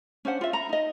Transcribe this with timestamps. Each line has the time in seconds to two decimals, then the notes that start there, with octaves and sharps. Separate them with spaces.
0.25 C#4 D4 C5 F#5
0.41 F4 E5
0.53 A#5 B5
0.69 D#4 D#5